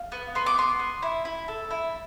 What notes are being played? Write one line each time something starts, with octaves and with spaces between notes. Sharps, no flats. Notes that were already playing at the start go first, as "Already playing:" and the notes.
Already playing: F5
B3
B3 C6
D6
B3 C6
B3
E4
E4
A4
E4